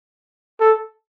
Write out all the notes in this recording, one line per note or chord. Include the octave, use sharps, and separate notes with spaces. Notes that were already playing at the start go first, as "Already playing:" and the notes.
A4